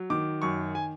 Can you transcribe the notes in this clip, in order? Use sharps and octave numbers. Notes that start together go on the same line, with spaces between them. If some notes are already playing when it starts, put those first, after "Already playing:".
Already playing: F#3
D#3 D6
F#2 C#6
G#5